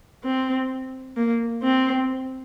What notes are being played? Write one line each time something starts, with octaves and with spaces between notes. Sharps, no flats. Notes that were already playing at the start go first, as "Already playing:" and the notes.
C4
A#3
C4